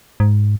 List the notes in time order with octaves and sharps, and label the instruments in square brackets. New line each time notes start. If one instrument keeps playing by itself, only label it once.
[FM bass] G#2